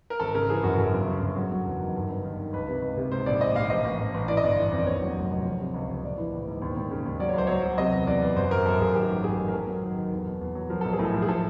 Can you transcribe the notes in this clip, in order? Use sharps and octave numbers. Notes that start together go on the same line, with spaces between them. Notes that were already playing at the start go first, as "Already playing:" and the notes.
A#4
G#1 A4
C#3 A#4
E3 G#4
F#2 F#4
F#2 A4
G1
C#3
F#2
F#3
F#3
E2
D#3
G2
G1
D#3
D#3
C#2 B4
C3
C#2
C3
G#2 C5
A#1 D5
A#1 D#5
A#1 F5
A1 D#5
A1
A1
A1
E3 D5
D#5
G1 D5
E3
F2
D5
D#2 C#5
F#3
F1
F1
F3
C3
C#2
C#2
A#1 D5
E3
A#1
G#2
D#2
D#2
C#3
D#2
F#3 D5
C#5
C#2 C5
F#3 C#5
F#3
C3 D#5
E2
E2 D5
E2
F#2 C5
F#2 A#4
F#2 A4
F#2 G#4
D#3 G4
A1
G#2 G#4
D#3
A#4
F#3 A4
F#3
D#3
D#3
E2
B2
E2
F#3
F3 A#4
B1 A4
G#4
A2
A4
F3
G#4
F3 A4